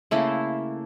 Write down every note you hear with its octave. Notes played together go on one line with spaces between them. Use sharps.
C#3 A3 A#3 E4